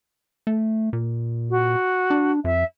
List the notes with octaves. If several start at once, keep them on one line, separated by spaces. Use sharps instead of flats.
A3
A#2
F#4
D4
F2 E5